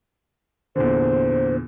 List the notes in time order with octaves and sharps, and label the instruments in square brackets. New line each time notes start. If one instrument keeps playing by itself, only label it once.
[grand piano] E2 A#2 D3 [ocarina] C5